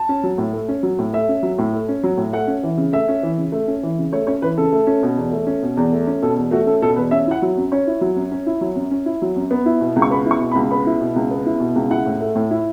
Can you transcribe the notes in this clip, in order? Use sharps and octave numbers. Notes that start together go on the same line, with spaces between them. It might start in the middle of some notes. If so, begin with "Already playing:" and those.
Already playing: A5
C#4
F#3
A2
A3
C#4
F#3
A2
A3 E5
C#4
F#3
A2
A3
C#4
F#3
A2
A3 F#5
C#4
E3
C#3
A3 E5
C#4
E3
C#3
A3
C#4
E3
C#3
A3 C#5
C#4 C#5
E3 B4
C#3 A4
A3
C#4
B2
E2
A3
C#4
B2
E2
A3
C#4
B2 A4
E2
A3 F#4
C#4 A4
B2 A4
E2 B4
C#4 E5
E4 F#5
F#3
F#2
C#4 C#5
E4
F#3
F#2
C#4
E4
F#3
F#2
C#4
E4
F#3
F#2
B3
E4
B2
C#2
C#6
B3 B5
E4
C#6
B2
B5
C#2
B3 B5
E4
B2
C#2
B3
E4
B2
C#2
E4 F#5
A2
A3
A2
E4